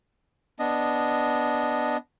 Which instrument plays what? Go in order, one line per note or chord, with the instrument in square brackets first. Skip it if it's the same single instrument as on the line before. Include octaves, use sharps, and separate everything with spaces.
[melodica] B3 D4 D#5